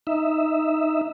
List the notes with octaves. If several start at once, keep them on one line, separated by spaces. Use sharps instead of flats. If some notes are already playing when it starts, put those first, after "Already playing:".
D#4 E5